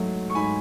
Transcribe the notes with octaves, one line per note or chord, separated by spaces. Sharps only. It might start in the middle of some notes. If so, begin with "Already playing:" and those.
Already playing: G#2 F#3 A3
C#6
G#2 G#5 B5